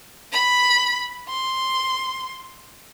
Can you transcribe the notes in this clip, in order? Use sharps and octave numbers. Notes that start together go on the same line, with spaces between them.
B5
C6